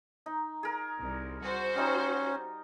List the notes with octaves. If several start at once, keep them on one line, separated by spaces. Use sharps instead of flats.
D#4
G#4 A#4
C2
F#4 C5
G3 C#4 D#4